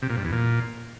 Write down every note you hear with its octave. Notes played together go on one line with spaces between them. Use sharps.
C3
A#2
G2
E2
A#2